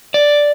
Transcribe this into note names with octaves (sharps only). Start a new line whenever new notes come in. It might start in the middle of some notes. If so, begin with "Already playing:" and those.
D5